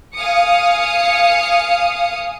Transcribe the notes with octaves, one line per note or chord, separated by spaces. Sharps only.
F5 G#5 D#6 C#7